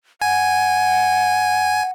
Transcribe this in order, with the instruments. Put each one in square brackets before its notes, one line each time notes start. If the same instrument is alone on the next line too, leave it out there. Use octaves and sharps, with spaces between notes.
[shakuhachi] F#5 [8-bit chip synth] G#5